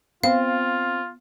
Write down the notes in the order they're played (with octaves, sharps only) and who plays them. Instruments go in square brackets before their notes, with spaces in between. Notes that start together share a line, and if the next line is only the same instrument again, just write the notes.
[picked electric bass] B3 [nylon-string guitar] C4 [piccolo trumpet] F4 [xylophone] F5